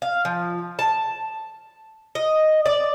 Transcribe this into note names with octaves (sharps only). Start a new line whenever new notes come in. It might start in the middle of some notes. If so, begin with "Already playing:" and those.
F5
F3
A5
D#5
D5